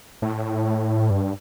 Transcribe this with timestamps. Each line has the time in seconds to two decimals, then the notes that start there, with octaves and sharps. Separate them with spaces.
0.22 A2
1.10 G2